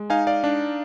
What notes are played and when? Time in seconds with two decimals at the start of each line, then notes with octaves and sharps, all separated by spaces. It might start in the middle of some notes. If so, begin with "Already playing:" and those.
Already playing: G#3
0.10 D#4 F5 G#5
0.27 D5 F5
0.44 D4